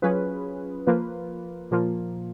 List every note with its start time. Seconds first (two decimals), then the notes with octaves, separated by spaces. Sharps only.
0.02 F#3 C#4 F4 G#4 B4
0.87 F3 A#3 F4 B4
1.71 A#2 F3 A#3 F4